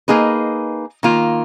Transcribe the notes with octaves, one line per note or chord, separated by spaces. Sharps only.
A#3 D#4 G#4 B4
D#3 A#3 F4